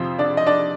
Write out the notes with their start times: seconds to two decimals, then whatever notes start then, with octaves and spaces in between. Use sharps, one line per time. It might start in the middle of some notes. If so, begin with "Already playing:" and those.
Already playing: F2 C3 F3 C4 C5
0.18 D4 D5
0.37 D#5
0.46 D4 D5